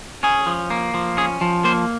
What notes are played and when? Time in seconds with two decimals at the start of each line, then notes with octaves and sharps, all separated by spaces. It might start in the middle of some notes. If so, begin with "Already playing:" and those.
0.23 C#4 G#4
0.46 F3
0.70 A#3
0.94 F3
1.17 C#4 G#4
1.41 F3
1.64 A#3 C5